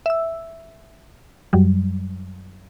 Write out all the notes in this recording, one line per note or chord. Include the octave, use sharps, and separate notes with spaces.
E5 E6
F#2 F#3 G3